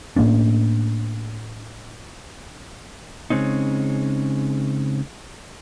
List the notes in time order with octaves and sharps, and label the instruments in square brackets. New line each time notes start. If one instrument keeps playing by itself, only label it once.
[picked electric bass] A2 A#3 C#4 D4
[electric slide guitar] C#3 G#3 C4 C#4 D#4